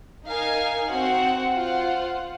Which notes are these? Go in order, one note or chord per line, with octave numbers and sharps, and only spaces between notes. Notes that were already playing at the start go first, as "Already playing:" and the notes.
D#4 A#4 F5 G#5
C4 F#4 C5 F#5
F4 C5 F#5